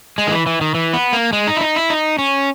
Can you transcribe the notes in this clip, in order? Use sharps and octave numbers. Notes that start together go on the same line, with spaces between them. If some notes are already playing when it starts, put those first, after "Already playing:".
G#3
D#3
E3
E3
D#3
E3
B3
A#3
G#3
D#4
E4
D#4
E4
D#4
C#4